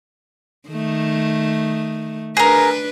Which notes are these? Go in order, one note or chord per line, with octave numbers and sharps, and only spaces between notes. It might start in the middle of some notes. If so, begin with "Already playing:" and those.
D#3 A3
D4 G#4 A#4 B4